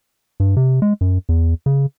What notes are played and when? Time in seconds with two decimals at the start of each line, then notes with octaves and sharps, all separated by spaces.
0.40 G2
0.57 C3
0.82 G#3
1.01 F#2
1.29 E2
1.66 C#3